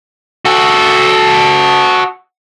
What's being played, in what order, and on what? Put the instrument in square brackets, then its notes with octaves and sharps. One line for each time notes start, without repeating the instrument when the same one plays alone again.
[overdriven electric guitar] F#4 A4